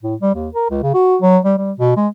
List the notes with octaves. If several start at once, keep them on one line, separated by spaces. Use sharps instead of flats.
A2
G3
D#2
A#4
C#2
C#3
F#4
F#3
G3
G3
B2
G#3